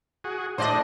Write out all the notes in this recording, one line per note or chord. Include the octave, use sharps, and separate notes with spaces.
F#4 G#4
A2 D4 C5 D5 D#5